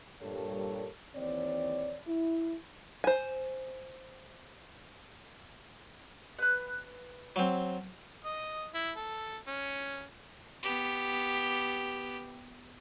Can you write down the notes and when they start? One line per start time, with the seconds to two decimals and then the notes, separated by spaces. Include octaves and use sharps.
0.21 G2 A#2 G3 A4 A#4 C#5
1.15 D#2 E3 C4 C#5 D5
2.06 E4
3.04 C5 G#5
6.38 B4 F#6
7.36 F#3 C4
8.25 D#5
8.74 E4
8.97 A4
9.47 C#4
10.63 B3 G4